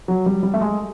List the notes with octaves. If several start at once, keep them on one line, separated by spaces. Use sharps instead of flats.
F#3
G3
G3
A3
G#3